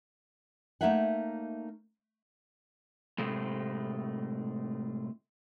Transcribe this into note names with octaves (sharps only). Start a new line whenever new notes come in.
A3 A#3 D#4 C#5 E5 F#5
A2 C3 G#3 A3